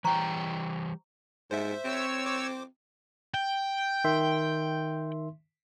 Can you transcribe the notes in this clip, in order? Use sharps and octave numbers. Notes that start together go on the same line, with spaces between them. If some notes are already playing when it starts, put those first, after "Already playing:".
E3 G3 C5 G5 A#5 C#6
G#2 C5 E5
C4 C#5 E6
C5 D6
G5
D#3 E5 C6